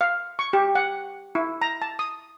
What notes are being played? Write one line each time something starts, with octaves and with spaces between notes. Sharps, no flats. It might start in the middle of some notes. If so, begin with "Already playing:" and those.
F5
C#6
G4
F#5
E4
A#5
A5
D#6